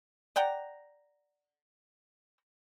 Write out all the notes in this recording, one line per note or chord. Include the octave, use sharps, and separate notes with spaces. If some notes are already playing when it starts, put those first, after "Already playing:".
D5 F#5 G5 A#5